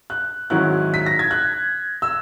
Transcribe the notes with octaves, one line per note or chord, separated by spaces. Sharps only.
F#6
G#2 D#3 F#3 C#4 E4 F#6
B6
A#6
G#6
F#6
E6